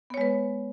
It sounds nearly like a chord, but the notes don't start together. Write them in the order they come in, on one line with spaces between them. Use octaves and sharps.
B3 C#5 G#3 B4